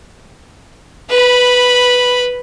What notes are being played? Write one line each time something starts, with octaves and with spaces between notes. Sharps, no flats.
B4 B5